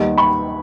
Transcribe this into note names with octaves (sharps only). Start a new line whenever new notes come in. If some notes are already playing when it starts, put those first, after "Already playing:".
Already playing: D#2 D#3 G3 B3
B5 C#6